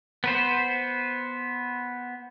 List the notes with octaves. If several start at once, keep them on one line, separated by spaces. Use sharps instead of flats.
B3 B4 C5